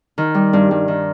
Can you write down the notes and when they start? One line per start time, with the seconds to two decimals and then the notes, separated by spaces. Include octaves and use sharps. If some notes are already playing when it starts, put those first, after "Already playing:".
0.18 D#3
0.34 G3
0.53 G2
0.71 G2
0.88 D#3